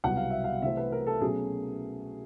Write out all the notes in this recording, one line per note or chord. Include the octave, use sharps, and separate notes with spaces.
C2 B2 F#3 B3 F#5
F5
E5
F5
C3 E3 A3 C4 E5
B4
A#4
A4
B2 F#3 A3 C#4 G#4